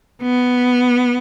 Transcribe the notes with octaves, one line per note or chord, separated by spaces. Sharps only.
B3